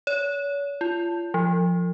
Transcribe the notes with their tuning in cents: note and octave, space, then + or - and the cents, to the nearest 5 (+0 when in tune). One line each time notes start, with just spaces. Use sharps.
C#5 +40
F4 -30
F3 +5